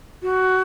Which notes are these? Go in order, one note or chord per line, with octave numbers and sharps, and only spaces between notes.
F#4